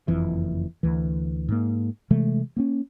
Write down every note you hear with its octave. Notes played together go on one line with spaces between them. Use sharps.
F#1 F2 E3
D2 E3
G#2 A#3
C3 E3 G#3 A3
A#3 B3 C#4